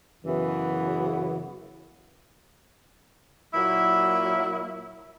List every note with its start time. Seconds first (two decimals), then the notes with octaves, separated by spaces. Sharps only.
0.23 F#2 C#3 E3 B3 F#4
3.54 A#2 F#3 A#3 E4